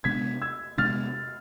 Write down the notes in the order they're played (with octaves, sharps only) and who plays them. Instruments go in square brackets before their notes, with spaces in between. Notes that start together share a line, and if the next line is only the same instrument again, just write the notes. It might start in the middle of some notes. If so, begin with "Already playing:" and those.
[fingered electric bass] C3 G#3 B3 D4 [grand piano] G#6 B6
[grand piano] E6 G#6
[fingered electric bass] C3 G#3 B3 D4 [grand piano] F6 A6